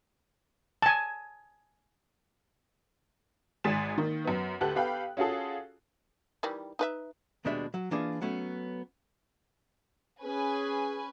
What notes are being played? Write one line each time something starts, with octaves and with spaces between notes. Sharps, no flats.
G#5 A5
G#1 G#3 G#5 A6 B6 E7
D#3 A#3
F#2 B3
D2 G4 A4 B4 F#6
B3 G4 A4 F5 G5 B5
C#4 F4 F#4 G#4 A4
D#3 E3 G3
D#4 B4 E5
D#2 B2 G3 G#3 D4 E5
F#3
E3 A#3 D4 F4 G#4 D5
F#3 A3 B3 C#4
C#4 G#4 B4 G#5